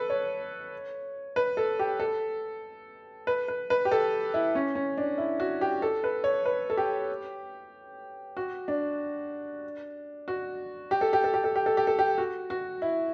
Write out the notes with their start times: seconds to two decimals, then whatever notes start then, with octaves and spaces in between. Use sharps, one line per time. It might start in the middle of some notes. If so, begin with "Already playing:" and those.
Already playing: A4 B4
0.10 C#5
1.36 B4
1.57 A4
1.79 G4
2.00 A4
3.27 B4
3.48 B4
3.70 B4
3.85 G4
3.92 A4
4.34 E4
4.55 C#4
4.75 C#4
4.98 D4
5.18 E4
5.40 F#4
5.61 G4
5.82 A4
6.04 B4
6.24 C#5
6.45 B4
6.70 A4
6.77 G4
8.37 F#4
8.68 D4
10.28 F#4
10.91 G4
11.01 A4
11.13 G4
11.24 A4
11.34 G4
11.44 A4
11.56 G4
11.66 A4
11.77 G4
11.87 A4
11.99 G4
12.18 F#4
12.50 F#4
12.82 E4